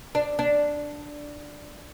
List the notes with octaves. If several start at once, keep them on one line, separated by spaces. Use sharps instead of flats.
D4
D4